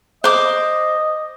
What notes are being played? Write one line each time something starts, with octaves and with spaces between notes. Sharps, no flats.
C5 D#5 D6